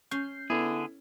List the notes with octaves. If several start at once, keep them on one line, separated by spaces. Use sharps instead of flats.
C#4 G6 C7
D3 B3 E4 G#4 A4